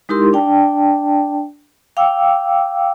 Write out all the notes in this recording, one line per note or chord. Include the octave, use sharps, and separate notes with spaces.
G#3 D#4 E4 G4 A#4 C6
D4 D5 G5 A5
F5 G5 D6 E6